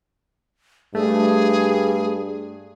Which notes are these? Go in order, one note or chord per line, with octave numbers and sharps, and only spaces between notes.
G2 A3 G#4